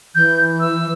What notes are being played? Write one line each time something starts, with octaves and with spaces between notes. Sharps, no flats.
E3 G6
E6